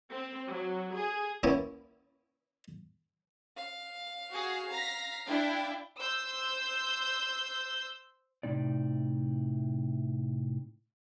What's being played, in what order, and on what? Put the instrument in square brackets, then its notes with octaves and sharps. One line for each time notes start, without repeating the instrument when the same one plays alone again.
[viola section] C4
F#3
G#4
[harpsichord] A#3 B3 C#4 E4
[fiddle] F5
[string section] F#4 G#4
A#5 A#6 B6
D4 E4 G5
[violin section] C5 E6 G6
[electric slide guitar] A2 C3 E3 C4 D#4 D5